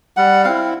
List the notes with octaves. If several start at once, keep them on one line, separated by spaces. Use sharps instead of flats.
G3 F#5
C4 E4 F5